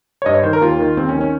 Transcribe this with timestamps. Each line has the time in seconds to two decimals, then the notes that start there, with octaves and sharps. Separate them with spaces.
0.22 C#5
0.26 G2 D#5
0.35 C#5
0.43 D#3 C5
0.53 A#4
0.61 D#2 F4
0.79 D#3
0.97 D#2 C4
1.09 C#4
1.16 D#3
1.21 C#4